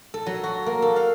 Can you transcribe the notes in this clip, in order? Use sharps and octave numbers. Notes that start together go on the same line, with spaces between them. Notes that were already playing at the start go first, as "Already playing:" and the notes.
A4
F#3
F#4
A#3
A4
F5